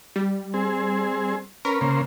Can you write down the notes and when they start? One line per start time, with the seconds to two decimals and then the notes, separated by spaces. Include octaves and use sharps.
0.16 G3
0.54 C4 G#4
1.65 C#4 A#4 B4
1.81 C#3 A#3 C5